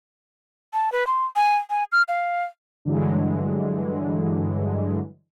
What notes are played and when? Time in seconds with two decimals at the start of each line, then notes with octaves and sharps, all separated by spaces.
0.73 A5
0.92 B4
1.07 C6
1.36 G#5
1.70 G#5
1.92 F6
2.08 F5
2.85 G2 D3 E3 F#3 G#3